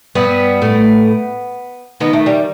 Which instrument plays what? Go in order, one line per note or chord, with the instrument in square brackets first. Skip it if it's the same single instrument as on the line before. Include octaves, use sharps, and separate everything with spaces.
[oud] G2 G3 [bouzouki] B3
[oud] A2 A3
[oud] D#3 D#4 [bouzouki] B3
[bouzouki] A3
G3